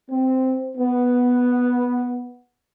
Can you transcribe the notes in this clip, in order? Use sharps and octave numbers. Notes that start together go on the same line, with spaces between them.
C4
B3